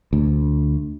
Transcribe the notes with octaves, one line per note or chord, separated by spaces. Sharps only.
D2